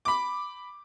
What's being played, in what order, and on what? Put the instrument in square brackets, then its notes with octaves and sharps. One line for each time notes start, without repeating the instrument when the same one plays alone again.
[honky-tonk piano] B5 D6